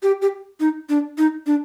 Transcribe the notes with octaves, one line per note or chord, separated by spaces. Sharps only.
G4
G4
D#4
D4
D#4
D4